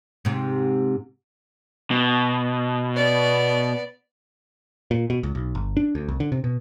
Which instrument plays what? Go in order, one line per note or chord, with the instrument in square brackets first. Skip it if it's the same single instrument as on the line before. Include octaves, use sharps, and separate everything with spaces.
[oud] G#2 C3
[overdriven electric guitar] B2
[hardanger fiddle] B3 D5
[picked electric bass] A#2
B2
C#2
B1
G1
D4
D2
C2
D3
C3
B2